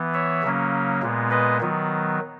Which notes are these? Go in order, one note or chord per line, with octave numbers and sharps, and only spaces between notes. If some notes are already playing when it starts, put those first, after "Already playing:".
Already playing: E3 B3
C#5 E5
C#3 F#3 A#3 C#4
A#2 G#3 B3
B4 D#5
D#3 F#3 B3